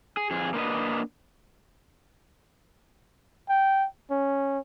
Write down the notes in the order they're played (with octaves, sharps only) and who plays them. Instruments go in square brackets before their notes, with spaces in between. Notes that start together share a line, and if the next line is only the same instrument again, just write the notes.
[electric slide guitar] G#4
F2 G#4
A#3 D4 B4 D#5
[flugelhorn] G5
C#4